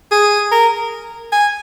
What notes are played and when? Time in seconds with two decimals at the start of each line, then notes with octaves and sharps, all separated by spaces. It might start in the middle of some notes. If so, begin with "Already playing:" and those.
0.11 G#4
0.51 A#4
1.32 G#5